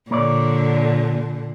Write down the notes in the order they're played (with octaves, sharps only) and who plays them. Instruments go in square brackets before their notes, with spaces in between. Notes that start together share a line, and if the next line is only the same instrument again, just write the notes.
[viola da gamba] A#2 [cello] D3 [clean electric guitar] A#3 C#5 D5